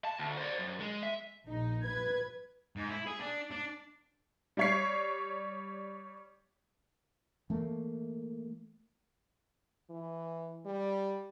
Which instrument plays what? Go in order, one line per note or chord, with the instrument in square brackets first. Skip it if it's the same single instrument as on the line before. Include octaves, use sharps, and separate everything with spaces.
[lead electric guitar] A5
D2
C5 D5
F#2
G#3
E5
[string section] A#1 D#4
B4 G#6
[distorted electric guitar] G#2
E4
G#4
D4
D4
[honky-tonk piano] G3 C#5 C7
[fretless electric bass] E3 A3 A#3
[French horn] E3
G3